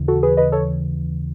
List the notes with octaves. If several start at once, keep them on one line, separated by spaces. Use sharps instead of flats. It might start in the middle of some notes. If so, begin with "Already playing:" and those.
Already playing: D#2 C#3 E3
F#4 A4
G#4 B4
B4 D#5
A4 C#5